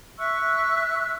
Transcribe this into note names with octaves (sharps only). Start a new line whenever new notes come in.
E5 C#6 E6 F#6